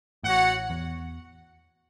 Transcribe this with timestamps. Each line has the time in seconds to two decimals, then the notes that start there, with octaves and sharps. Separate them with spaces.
0.23 A1 A2 F#4 C#5 F#5
0.70 E2